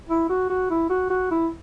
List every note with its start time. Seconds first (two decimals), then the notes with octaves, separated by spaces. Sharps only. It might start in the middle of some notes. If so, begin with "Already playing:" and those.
0.09 E4
0.30 F#4
0.50 F#4
0.70 E4
0.90 F#4
1.10 F#4
1.31 E4